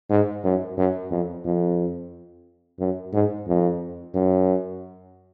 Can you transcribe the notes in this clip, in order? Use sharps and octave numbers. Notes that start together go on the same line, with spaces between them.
G#2
F#2
F#2
F2
F2
F#2
G#2
F2
F#2